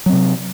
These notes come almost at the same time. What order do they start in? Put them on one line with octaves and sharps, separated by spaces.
F#3 C4 C3